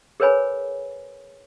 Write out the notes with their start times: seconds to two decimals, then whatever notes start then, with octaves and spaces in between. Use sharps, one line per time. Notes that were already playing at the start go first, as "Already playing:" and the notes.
0.20 G#4 A#4 B4 C#5 G#5 B5